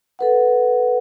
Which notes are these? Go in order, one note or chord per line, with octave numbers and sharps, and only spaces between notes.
A4 B4 F#5